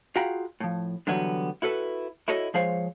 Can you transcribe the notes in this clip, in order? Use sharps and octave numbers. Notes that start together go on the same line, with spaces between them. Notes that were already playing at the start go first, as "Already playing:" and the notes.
F4 F#4 G#4 G5 A#5 B5
A2 F3
D3 E3 F#3 G3 B3 C#5
E4 F#4 A4 B4
E4 F#4 A4 C#5 D#5
F3 G#3 G#4 C5 C#5 F5